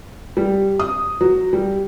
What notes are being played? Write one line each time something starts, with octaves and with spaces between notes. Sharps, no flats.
G3
D#6
F#3
G3